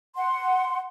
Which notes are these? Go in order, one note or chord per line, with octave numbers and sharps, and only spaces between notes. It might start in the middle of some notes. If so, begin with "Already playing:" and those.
F#5 C6